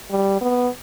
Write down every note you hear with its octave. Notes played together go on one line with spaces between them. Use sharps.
G3
B3